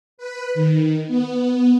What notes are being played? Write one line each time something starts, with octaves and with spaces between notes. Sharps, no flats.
B4
D#3
B3